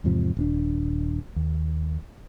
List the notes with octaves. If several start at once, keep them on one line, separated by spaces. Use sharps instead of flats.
E2 G#2 C3 F3
D#1 C4 D4
D#2